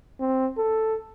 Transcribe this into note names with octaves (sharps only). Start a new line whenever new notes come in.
C4
A4